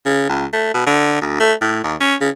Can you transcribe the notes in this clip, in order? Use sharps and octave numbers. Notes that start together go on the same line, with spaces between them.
C#3
C#2
A3
B2
D3
D2
A3
A2
D#2
C#4
C#3